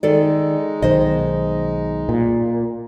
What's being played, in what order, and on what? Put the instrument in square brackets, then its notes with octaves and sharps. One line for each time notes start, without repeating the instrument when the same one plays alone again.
[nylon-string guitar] D#3 A4 D5 [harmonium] G#3 D#4
[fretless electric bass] B1 D#3 [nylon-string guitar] C5 D#5
[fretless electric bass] A#2